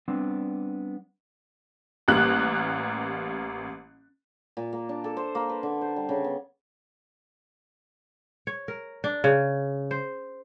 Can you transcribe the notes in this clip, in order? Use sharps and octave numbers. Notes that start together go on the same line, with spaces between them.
G3 B3 C4 D4
A1 G3 A#3 F#6
A#2
A#3
D4
A4
C5
A#3
B4
D3
C5
G3
C#3
B3
C#5
A#4
D4
C#3
C5